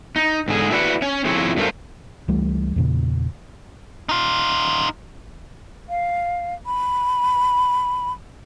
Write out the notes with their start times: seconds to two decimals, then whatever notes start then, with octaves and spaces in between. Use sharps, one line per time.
0.16 D#4
0.48 G#2 D3 G#4
0.70 E4 F#4 B4 D5 D#5 F#5
1.02 C#4 C#5
1.25 F3 C4 E4 F4 G#4 C#5
1.57 G2 F#3 A3 A#4 C5 F5
2.28 C#2 E3 G3 A3
2.76 E2 A#2 C#3
4.09 D#4 F4
5.89 F5
6.66 B5